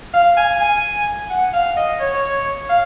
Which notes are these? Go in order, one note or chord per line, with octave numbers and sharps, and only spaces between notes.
F5
G#5
G#5
F#5
F5
D#5
C#5
F5